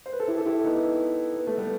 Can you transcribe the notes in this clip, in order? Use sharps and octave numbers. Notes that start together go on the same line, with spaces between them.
C5
B4
A4
E4 G4
A4
E4 G4
B3 D#4
B3
A3
G3 B3